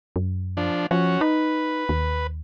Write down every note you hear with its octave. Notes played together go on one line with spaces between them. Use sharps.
F#2
F3 D4
F3 C#4 F#4
D#4 B4
D#2